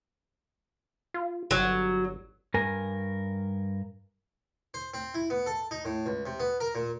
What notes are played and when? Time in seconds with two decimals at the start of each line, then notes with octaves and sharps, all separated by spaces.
1.14 F4
1.51 G1 F#3
2.54 G2 A#4 G#5
4.74 C5
4.94 C4
5.14 E4
5.30 B3
5.46 A4
5.71 D#4
5.85 A2
6.06 C#2
6.26 C3
6.40 B3
6.60 A#4
6.75 A#2